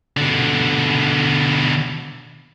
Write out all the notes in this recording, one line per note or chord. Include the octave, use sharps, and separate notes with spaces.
B2 D3